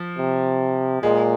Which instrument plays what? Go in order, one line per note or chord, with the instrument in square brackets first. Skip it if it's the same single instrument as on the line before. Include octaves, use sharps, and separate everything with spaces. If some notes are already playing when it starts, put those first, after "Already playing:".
Already playing: [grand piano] F3
[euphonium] C3
[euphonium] A#2 [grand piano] G#3